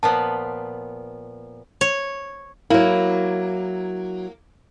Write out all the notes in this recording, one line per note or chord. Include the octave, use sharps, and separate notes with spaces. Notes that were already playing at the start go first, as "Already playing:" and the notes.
A#2 F3 B3 A5
C#5
F#3 A#3 E4